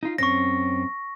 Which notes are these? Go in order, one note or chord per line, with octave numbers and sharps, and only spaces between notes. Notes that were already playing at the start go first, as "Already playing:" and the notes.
D#4 F4
F#2 C4 C#4 C#6 A#6